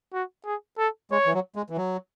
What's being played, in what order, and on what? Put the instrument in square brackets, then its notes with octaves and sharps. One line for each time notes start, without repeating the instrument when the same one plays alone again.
[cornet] F#4
G#4
A4
[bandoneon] G#3 [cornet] C#5
[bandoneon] E3
F#3
G#3
E3
F#3